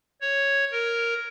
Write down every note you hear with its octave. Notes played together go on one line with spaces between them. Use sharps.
C#5
A#4